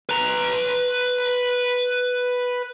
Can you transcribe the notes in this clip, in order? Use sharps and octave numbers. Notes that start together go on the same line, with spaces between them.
B4 A#5